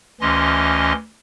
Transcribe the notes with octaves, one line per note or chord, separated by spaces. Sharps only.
D2 E3 C#4 D#5 C6